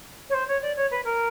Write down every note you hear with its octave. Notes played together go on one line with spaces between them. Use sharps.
C#5
C5
C#5
D5
C#5
B4
A#4